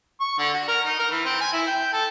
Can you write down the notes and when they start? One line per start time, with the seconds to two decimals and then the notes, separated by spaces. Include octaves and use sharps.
0.21 C#6
0.38 D3
0.53 F#4
0.68 A#4
0.86 D#4
0.99 A#4
1.11 E3
1.25 C4
1.41 G#5
1.53 E4
1.67 G5
1.93 A4